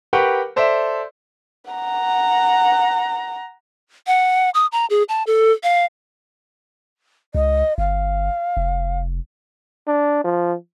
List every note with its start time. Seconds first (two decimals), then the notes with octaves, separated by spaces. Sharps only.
0.13 G4 A#4 B4 F#5 G5 C#6
0.56 A4 C5 D5 E5
1.71 F#5 A#5
4.07 F#5
4.54 D#6
4.72 A#5
4.90 G#4
5.09 A5
5.27 A4
5.63 F5
7.35 C#2 D#5
7.78 G1 F5
8.57 F1
9.87 D4
10.24 F3